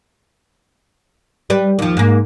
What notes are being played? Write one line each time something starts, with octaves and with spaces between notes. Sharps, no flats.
G3 B4
D#2 F3
G#2 A#3